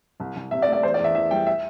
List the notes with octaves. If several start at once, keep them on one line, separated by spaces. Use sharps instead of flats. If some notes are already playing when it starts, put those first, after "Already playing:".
C2
C2
C3 E5
D5
A3
D5
E2 C5
D5
E2
E5
E3 E5
G3 G5
E5